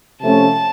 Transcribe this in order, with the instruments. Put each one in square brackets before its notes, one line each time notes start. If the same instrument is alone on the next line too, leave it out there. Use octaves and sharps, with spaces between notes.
[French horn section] C3 F3 A3 C#4 [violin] A5